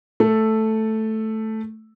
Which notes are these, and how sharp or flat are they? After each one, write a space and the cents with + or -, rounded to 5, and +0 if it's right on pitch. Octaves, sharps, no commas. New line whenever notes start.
A3 +0 A4 +0